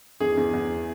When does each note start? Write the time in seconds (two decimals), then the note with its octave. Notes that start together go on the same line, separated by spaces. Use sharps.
0.20 E2 G#4
0.37 E2
0.54 E2